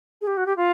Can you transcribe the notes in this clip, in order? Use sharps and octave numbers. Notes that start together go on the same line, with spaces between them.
G#4
G4
F#4
G4
F4